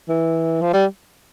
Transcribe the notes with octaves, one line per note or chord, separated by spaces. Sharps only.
E3
F3
G3